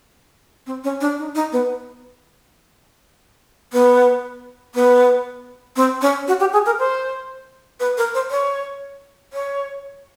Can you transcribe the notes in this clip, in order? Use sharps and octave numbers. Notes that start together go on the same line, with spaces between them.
C4
C#4
D4
D#4
D#4
B3
B3
B3
C4
C#4
F#4
G4
G#4
A#4
C5
B4
A#4
C5
C#5
C#5